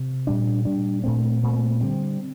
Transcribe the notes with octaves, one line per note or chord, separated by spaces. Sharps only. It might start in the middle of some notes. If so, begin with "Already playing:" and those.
Already playing: C3
A#2 G3 D4
A#2 G3 D4
A#2 A3 C4
A#2 A3 C4
D3 G3 C4